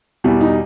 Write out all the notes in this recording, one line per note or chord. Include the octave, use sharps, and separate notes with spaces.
E2 B2 G3 E4
D#4